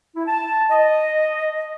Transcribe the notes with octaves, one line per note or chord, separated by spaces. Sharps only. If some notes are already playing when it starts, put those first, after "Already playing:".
E4
A5
D#5